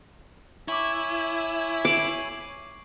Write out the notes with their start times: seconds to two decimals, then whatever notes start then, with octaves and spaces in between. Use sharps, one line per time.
0.68 E4 C#5 G#5 C#6 D6
1.85 D6 C7 F#7